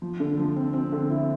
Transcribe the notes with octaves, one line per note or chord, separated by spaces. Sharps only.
F3
D3
F3
C4
C4
D3
E4